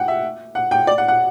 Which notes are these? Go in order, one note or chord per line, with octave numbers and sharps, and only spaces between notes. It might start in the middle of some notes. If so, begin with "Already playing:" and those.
Already playing: F#5 G5
E5
F#5
G5
D5
F#5
F#5